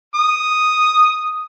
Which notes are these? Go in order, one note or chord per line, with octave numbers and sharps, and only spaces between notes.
D#6